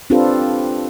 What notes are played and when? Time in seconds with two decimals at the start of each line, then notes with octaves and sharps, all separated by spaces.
0.10 C4 D4 F4 G4 A4 B4